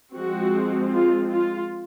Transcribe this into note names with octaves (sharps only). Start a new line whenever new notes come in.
F3 G#3 C4 F#4
F4
F4